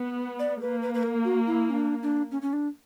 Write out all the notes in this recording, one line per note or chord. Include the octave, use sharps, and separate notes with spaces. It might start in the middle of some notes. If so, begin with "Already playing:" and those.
Already playing: B3
D5
A#3 B4
B4
B4
A#4
F#4
E4
C#4
D4
D4
C#4
C#4
D4